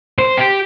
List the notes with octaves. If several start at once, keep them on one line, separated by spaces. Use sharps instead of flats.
C5
G4